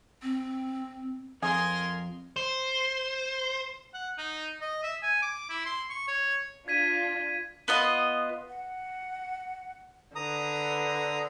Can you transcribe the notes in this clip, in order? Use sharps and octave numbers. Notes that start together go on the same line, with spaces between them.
C4
F2 G#4 A#4 G#5 C6
C5
F#5
D#4
D#5
E5
G#5
D6
E4
C6
C#6
C#5
D4 F4 G#6 B6 D#7
B3 F4 D#5
F#5
D3 B4 A#5 D#6